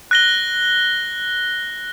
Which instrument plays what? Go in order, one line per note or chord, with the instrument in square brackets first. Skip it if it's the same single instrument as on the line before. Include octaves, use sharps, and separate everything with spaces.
[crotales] F#6 A#6 G7